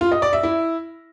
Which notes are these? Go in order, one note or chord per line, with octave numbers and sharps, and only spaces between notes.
F4
D#5
D5
E5
E4